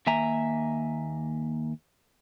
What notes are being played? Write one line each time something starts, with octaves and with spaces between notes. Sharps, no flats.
D#2 A#3 E5 G#5 A#5